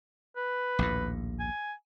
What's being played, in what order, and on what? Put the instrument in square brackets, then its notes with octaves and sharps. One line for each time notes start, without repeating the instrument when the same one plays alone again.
[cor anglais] B4
[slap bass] A#1 D#2 A2
[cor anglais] G#5